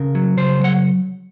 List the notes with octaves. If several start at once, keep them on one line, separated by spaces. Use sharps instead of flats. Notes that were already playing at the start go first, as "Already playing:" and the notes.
Already playing: C#3 A#4
F#3
C#3 C5
F#3 F#5